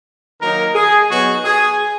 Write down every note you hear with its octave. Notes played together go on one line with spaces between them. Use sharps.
D#3 F#3 A#3 D#4 A#4
G#4
B2 F#3 B3 D#4 F#4
G#4